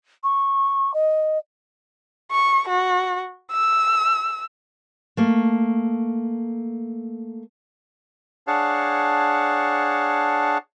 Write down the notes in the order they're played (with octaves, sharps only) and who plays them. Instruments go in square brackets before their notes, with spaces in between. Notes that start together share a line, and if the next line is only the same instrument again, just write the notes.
[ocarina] C#6
D#5
[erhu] C#6
F#4
E6
[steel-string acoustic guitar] A3 A#3
[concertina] D4 G#4 C#5 F5 F#5 A5